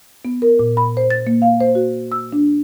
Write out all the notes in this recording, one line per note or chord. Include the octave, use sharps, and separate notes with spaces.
B3
A#4
A#2
B5
C5
A6
A#3
F5
C5
F#4
E6
D4